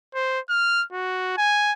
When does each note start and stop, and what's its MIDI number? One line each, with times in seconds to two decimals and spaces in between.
0.15 0.39 72
0.49 0.83 89
0.92 1.37 66
1.38 1.73 80